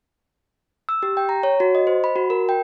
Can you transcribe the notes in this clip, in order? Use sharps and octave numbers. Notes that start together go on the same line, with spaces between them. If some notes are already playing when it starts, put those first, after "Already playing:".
E6
G4
G5
A#5
C#5
F#4
D#5
C5
B5
F#4
A#4
G5